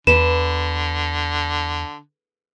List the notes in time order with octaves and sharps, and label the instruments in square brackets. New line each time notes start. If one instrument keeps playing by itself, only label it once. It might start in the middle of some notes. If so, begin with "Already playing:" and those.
[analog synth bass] E2 [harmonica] D3 [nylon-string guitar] B4 [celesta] E7